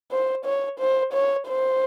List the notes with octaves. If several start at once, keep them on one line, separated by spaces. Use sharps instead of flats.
C5
C#5
C5
C#5
C5